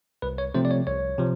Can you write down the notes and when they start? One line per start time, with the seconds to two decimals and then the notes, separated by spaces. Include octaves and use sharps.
0.22 C2 B4
0.38 C#5
0.54 C3 F3 A3 C4 C5
0.65 D5
0.71 C#5
0.87 C2 C#5
1.18 C3 F3